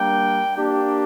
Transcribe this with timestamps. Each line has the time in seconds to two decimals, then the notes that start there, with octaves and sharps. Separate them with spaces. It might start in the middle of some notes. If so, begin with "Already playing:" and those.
Already playing: G3 A#3 D4 G5
0.57 A#3 D4 G4